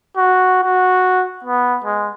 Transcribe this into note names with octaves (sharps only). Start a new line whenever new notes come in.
F#4
F#4
B3
G#3